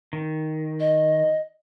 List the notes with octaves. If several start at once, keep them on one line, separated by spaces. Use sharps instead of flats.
D#3
D#5